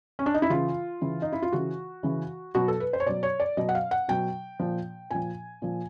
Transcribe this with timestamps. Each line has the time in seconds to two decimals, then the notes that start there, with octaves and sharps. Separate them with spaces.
0.19 C#4
0.26 D4
0.34 D#4
0.42 E4
0.50 C#3 E3 F4
1.01 C#3 E3
1.22 D#4
1.33 E4
1.42 F4
1.52 C#3 E3 F#4
2.03 C#3 E3
2.55 B2 F#3 F#4
2.68 A4
2.80 B4
2.93 C5
3.00 C#5
3.06 B2 F#3 D5
3.23 C#5
3.40 D5
3.57 B2 F#3 D#5
3.69 F#5
3.75 F5
3.91 F#5
4.08 B2 F#3 G5
4.60 A#2 F3
5.11 A#2 F3 G#5
5.62 A#2 F3